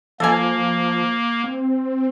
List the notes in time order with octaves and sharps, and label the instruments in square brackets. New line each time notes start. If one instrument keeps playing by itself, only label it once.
[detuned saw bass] F3 [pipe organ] A#3 [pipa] A4 G#5
[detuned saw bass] C4